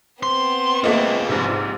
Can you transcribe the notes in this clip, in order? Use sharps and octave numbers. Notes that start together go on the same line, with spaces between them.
B3 C4 C6
A3 A#3 F4 G#4 D#5
A#1 G#2 C3